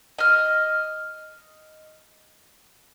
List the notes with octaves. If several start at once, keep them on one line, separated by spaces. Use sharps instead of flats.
D#5 F6